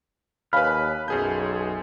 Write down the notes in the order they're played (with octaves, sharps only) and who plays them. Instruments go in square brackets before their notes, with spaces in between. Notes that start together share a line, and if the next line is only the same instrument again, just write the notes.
[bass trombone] D#2 [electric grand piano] B4 B5 [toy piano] C#5 F5 G#5 [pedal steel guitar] F6
[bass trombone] B1 [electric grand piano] F#2 G#4 G6 [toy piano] A5